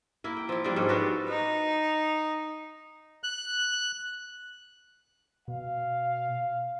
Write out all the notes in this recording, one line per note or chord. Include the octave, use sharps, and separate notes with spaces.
A#3 E4
G5
F3 E4
G3 A#3 D4
G#2 F3 C#4 A4
B3 D4 F#4 G4
D#4
F#6
B2 F5